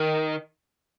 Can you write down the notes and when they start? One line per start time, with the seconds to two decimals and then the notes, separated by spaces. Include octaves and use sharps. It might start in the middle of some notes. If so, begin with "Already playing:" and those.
Already playing: D#3